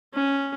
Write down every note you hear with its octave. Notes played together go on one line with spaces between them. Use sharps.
C#4